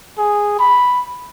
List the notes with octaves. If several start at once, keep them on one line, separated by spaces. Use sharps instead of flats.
G#4
B5